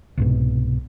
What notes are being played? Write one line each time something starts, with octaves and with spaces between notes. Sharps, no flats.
C2 G#2 B2